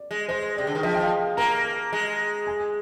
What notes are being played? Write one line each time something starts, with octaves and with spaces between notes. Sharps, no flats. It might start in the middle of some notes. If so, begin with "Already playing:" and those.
Already playing: D5
G#3
G#3 C5
C3 D5
D3
D#3
F3 D#5
G5
F5
A#3 A#5
G#3
G#5